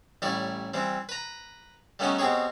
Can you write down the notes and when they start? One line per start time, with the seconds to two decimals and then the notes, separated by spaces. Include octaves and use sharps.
0.22 A1 G3 E4 C#5 D5
0.74 E3 G3 C4
1.09 B4 A#5
1.99 G3 A3 B3 C#4 D#4 G4
2.18 B2 C4 G4 G#4 C#5